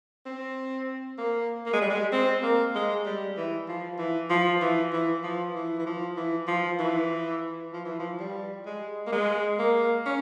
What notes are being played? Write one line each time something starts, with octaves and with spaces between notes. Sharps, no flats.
C4
A#3
A#3
G#3
G3
G#3
C4
A#3
G#3
G3
E3
F3
E3
F3
E3
E3
F3
E3
E3
F3
E3
F3
E3
F3
E3
F3
G3
G#3
A#3
G#3
A#3
C#4